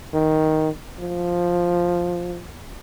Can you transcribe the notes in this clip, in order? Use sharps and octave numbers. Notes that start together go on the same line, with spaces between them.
D#3
F3